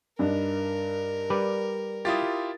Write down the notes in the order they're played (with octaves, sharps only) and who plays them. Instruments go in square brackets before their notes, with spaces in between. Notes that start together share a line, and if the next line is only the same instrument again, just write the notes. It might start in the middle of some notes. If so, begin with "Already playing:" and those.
[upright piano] G2 D4 D#4 [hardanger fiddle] A#4
[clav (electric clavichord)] G3 B4 D5
[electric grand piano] E4 F4 G4 [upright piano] D#6 A6